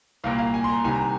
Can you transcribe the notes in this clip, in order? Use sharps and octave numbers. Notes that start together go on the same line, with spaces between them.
C2 A#2 A#3 F5
F5
G#5
C6
A#5
C2 C3 D#3 G#5
A#5